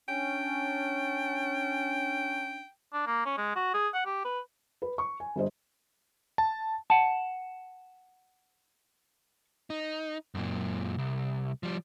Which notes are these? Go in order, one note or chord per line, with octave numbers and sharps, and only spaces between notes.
C#4 D4 G5
D4
A#3
C#4
G#3
F#4
G#4
F#5
G4
B4
B4
C#6
G#5
G1 G4 C5 D#5
A5
F#5 A5
D#4
F#2 A#2
C2
F3 G3